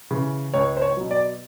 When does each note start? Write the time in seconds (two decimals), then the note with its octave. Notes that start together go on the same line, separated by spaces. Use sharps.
0.11 C#3 E3
0.54 C#2 C#5
0.77 C5
0.82 C#5
0.97 B2 F#3
1.11 D5